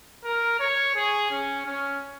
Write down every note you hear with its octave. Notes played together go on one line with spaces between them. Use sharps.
A#4
C#5
G#4
C#4
C#4